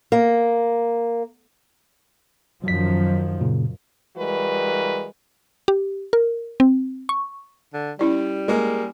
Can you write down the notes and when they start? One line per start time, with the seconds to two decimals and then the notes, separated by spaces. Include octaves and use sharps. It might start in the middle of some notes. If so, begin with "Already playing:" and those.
0.12 A#3
2.64 F#2 D#3 F3 F#3 B6
3.41 A#2 C#3
4.17 E3 G3 G#3 F#4 A#4 B4
5.68 G4
6.13 A#4
6.60 C4
7.09 C#6
7.74 D3
7.99 G3 C#4 E4 D5
8.48 G#3 A#3